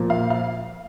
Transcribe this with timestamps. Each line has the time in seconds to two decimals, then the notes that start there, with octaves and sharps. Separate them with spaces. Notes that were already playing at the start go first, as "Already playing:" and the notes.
Already playing: A#2 F3 A#3
0.10 F5
0.30 F5